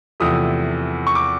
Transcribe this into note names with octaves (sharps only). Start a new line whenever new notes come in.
E2 C3 F3 A3 D#6
C#6
D6